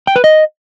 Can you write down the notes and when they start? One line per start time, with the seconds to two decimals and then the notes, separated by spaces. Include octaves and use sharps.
0.07 G5
0.16 B4
0.24 D#5